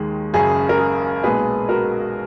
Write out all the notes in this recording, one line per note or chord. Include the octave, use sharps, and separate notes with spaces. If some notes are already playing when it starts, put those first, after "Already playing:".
Already playing: D#2 D#3 G#3
F#1 F#2 C#3 G#4
A#4
G#4
B1 A#2 G#3 G#4 B4
F#4 A#4